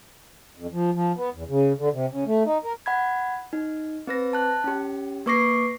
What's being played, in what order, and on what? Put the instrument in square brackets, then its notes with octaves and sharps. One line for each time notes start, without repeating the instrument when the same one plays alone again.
[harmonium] F2
F3
F3
B3
E2
C#3
D3
C3
C#3
A3
D#4
A#4
[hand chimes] F#5 B5 G#6
D#4
C4 B4 A#6
A5 F#6
C#4 G4
A#3 B4 C#6 D6 A#6 C7